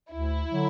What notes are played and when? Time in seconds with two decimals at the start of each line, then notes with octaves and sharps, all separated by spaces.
0.11 D2 E4
0.49 D3 F#3